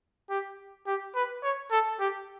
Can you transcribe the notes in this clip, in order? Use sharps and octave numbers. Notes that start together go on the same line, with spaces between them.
G4
G4
B4
C#5
A4
G4